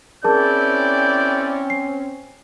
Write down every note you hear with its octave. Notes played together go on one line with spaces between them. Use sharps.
C4 C#4 E4 G#4 A#4 D5 A5 G6
C7